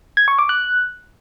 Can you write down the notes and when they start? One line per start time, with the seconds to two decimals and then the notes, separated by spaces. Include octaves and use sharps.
0.17 G#6
0.28 C#6
0.39 D6
0.49 F#6